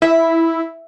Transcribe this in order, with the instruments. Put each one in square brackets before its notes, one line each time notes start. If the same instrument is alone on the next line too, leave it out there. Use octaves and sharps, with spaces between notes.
[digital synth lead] E4 [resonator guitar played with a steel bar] E5